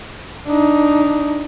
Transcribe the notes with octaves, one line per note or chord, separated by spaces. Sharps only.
D4 D#4